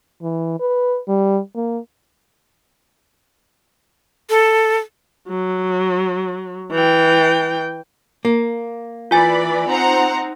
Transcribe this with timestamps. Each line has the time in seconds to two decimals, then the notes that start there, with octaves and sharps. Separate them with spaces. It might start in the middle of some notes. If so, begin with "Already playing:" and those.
0.22 E3
0.60 B4
1.08 G3
1.56 A#3
4.29 A4
5.28 F#3
6.71 E3 G5
8.25 A#3
9.11 E3 F4 D5 G#5 B5 A6
9.69 C4 D#4 C5 F#5 A#5